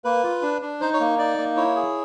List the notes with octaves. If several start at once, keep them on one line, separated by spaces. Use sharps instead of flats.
A#3 B4
F4
D4
D4
D#4 C5
C#5
A#3
D#4 D5
A#3
E4 C#5
G#4